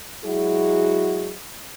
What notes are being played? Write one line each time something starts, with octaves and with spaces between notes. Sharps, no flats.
F#3 G#3 E4 F#4 G#4